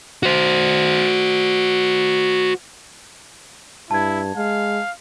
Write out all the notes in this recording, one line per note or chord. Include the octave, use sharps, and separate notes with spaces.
F#4 C5
G2 E4 A5 G#6
G#3 F5